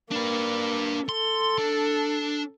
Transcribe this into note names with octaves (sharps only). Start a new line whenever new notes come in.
A#3 D4 B4
A4 C6
D4